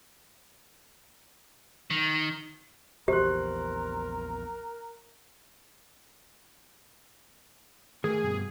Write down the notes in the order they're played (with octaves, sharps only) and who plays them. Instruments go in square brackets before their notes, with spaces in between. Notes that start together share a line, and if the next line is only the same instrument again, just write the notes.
[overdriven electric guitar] D#3
[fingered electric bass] A#1 E2 [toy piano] G4 [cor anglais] A#4 [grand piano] C5 C6 F#6
[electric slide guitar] D#3 A3 A#4 [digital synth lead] G#4
[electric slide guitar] G2 B2